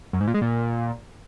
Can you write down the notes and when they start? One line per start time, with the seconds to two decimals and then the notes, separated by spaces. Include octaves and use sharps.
0.13 F#2
0.20 G#2
0.27 A#2
0.34 G#3
0.41 A#2